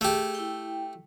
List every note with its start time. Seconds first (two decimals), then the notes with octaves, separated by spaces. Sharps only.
0.01 A3 G4 G#4
0.35 E4 G5